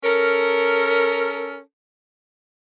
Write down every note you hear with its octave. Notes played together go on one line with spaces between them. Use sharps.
C#4 A4 A#4